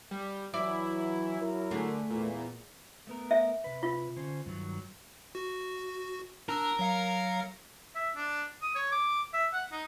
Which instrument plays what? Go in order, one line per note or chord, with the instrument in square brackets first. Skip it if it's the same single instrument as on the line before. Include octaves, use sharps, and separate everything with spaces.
[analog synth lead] G3
[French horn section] E3 F#3 [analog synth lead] E4 [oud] D5
[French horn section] F#3 E4 A#4
[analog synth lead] D3 [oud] A3 G#4
[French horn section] E2 [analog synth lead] A#2
[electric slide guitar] A3 B3 A#4
[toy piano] E5
[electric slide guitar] C3 B4
[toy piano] F4
[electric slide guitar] D3 C#4 C5
G2 D#3 F#3
[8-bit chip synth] F#4
[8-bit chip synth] D4 E6 [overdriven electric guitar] A#4
[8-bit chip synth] F#3 F5 C#7
[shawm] E5
D4
D#6
C#5
D6
E5
F#5
D#4